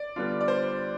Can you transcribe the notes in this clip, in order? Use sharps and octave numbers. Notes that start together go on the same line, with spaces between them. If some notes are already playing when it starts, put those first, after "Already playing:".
Already playing: D5
D3 G3 B3 D4 F4
D5
C5